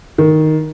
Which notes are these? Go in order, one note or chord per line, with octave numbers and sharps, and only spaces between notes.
D#3